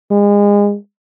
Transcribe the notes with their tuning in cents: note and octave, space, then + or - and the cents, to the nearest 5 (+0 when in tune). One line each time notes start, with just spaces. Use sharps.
G#3 -30